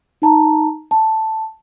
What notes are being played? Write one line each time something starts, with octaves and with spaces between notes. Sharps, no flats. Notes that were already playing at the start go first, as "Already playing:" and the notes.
D#4 A5 A#5
A5